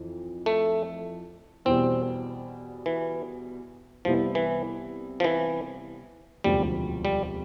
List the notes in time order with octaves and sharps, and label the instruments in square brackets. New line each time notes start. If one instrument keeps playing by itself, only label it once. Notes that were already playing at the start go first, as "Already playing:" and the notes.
Already playing: [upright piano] F2 E3
[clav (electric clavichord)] A3
[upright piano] E2 B2 G3 [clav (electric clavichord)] C4
[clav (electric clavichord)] E3
[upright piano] C2 C3 G3 B3 E4 [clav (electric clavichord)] F3
[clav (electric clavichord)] E3
F3
E3
[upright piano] E1 D2 C3 F3 [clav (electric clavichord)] G3
[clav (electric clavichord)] G3